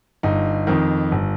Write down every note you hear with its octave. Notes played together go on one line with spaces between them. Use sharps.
G1 D#4
F2 D#3
G1